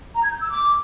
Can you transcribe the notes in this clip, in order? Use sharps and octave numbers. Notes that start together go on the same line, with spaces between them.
A#5
G#6
G6
E6
D6